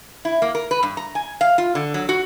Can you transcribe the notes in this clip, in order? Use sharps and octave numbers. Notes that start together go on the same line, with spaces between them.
E4
A#3
A#4
B4
G2
A#5
G#5
F5
F4
D3
F#3
F#4